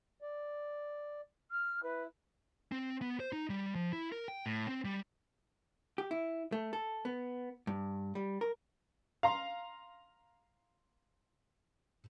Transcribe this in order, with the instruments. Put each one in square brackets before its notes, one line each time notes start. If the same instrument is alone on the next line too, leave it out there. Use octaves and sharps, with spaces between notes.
[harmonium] D5
[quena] F6
[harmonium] E4 [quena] B4
[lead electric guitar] C4
B3
C5
D#4
G3
F3
E4
A#4
G5
A2
C4
G3
[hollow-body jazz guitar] G4
E4
A3
A4
B3
G2
G3
A#4
[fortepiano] F5 A#5 C6